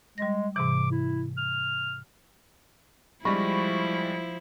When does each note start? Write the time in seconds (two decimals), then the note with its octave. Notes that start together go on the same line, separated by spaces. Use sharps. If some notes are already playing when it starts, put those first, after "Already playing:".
0.18 G3 G#3 A#6
0.56 G#2 C3 E3 D6
0.91 E4
1.37 F6
3.25 F3 G3 G#3 E4 B5 C#6 A#6